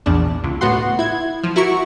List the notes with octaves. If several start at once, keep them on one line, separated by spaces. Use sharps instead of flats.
A#1 E2 D4
C#2
A2 B3 F#4 F#5 C6
E4 G#6
F3
E4 F#4 A#4 C#6